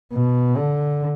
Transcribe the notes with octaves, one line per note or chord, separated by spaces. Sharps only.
B2
D3